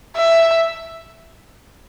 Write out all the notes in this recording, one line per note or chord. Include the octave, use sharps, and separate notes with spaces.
E5